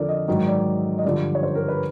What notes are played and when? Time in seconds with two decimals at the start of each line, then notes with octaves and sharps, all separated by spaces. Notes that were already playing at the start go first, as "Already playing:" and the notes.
Already playing: F2 D3 F3 A4 A#4 D5
0.09 D#5
0.28 G#2 D#3 F#3 D#5
0.47 D5
0.98 D#5
1.04 G2 D3 F3 D5
1.35 C#5
1.43 C5
1.55 A#4
1.68 B4